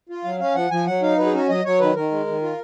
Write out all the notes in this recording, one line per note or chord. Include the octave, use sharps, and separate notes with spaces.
F4
F#3 F5
C#4 F5
F3 F#5
F3 G#5
F#3 F#5
D#4 F5
F#3 B4
G#4
C#4 F#4
F#3 D#5
F#3 C#5
D#3 B4
D#3 A#4
G#3
D#3
F4